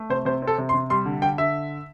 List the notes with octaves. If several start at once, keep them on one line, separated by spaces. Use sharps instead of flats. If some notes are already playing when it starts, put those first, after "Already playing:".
Already playing: A3
C3 C5
C3 C5
C4
A4
C3
C6
C3
G3 C6
D3
D3 G5
D3 E5